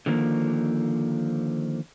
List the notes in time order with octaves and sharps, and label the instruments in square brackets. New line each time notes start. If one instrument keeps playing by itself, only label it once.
[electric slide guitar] D3 D#3 F3 A#3